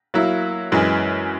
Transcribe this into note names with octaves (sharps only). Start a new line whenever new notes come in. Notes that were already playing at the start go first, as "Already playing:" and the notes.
F#3 A#3 E4
F#2 E3 G#3